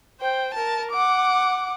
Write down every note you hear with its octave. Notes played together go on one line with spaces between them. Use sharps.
C5 G5
A#4 A5
F#5 D6